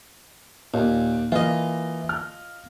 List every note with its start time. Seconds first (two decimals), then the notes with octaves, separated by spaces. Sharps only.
0.74 D#2 A#2
1.32 E3 A#3 F4 D#5
2.09 F6